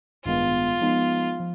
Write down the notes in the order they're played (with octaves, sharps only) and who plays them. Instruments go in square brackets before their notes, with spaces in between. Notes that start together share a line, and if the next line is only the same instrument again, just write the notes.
[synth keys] A1 G2 D#3 G#3 B3 [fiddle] F4
[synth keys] F3 G#3 B3 D#4
F3